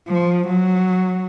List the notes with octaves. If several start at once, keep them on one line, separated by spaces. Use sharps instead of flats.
F3
F#3